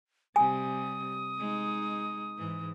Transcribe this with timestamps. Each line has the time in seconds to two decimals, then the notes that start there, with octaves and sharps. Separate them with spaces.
0.36 C3 G3 G#5 D#6
1.39 G#3 D#4
2.38 G#2 E3